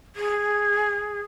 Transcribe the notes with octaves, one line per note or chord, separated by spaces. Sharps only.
G#4